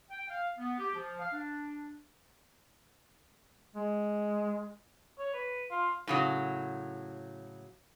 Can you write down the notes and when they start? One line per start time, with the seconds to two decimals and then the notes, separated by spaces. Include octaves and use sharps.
0.11 G5
0.30 F5
0.58 B3
0.79 G4
0.94 F3
1.20 F5
1.33 D4
3.76 G#3
5.19 C#5
5.34 B4
5.70 F4
6.08 A2 C#3 F#3